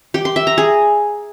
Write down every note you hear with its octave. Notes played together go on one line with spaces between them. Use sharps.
G4
C6
E5
A#5
G#4